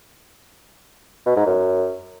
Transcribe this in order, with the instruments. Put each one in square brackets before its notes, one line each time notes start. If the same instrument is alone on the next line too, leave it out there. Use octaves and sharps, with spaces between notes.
[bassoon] B2
G#2
F#2